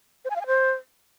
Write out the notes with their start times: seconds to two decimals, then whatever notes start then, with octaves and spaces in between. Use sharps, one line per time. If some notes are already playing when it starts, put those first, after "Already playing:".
0.25 C5
0.30 G#5
0.36 F5
0.41 G#5
0.47 C5